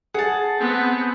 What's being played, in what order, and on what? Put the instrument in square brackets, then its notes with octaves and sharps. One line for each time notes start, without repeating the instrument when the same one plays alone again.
[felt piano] G#4 [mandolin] F#5 A5
[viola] B3 C4